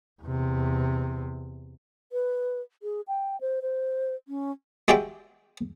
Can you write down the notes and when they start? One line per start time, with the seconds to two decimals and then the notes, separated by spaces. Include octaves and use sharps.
0.23 E2 C3
2.12 B4
2.83 G#4
3.08 G5
3.41 C5
3.62 C5
4.28 C#4
4.88 G#3 F#4 G4 D5 E5 G5